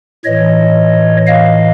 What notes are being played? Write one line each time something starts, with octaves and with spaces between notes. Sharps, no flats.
A2 E3 C#5 D#5
D#5 F5